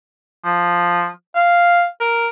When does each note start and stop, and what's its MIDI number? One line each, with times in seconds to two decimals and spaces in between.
0.44 1.07 53
1.35 1.85 77
2.00 2.29 70